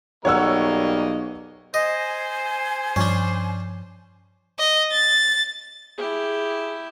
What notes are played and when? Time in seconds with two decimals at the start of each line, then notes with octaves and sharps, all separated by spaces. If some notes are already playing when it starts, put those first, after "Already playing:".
0.25 B1 G3 A#3 A#4 C#5 D#5 F#5 E6
1.74 C5 D#5 G#5
2.96 G2 F3 C#4 D4
4.59 D#5
4.92 A6
5.98 E4 G4 G#4